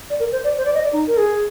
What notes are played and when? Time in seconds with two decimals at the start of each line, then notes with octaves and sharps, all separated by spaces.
0.10 D5
0.20 A#4
0.32 C5
0.44 D5
0.58 C5
0.65 D5
0.74 D#5
0.84 D5
0.93 D#4
1.08 A#4
1.17 G#4